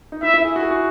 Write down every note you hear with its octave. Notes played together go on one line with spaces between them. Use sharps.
D#4
E4 E5
E4
G#4
F#4
G#4
F#4